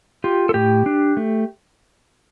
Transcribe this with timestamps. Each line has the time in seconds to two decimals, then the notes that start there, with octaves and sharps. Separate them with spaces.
0.24 F4 G4
0.49 A4
0.54 A2 G4
0.86 D4
1.17 A3